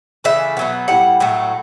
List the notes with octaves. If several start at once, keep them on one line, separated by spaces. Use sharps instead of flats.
C#3 E3 A3 E5
B2 F#3 B3
A2 G3 F#5
A2 F#3 A3